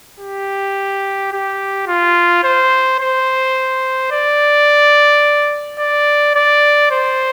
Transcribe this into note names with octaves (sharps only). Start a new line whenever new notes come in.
G4
G4
F4
C5
C5
D5
D5
D5
C5